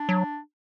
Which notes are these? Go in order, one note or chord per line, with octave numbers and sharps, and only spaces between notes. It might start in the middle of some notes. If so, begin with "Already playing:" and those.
Already playing: D4
F#3